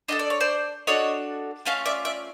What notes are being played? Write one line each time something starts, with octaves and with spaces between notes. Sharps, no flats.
D4 F#4 A4 D#5
D5
C#5
C5 D5
D4 F#4 A4 C#5 D#5
A3 C#4 F4 D#5 F5
D5 E5
D5 E5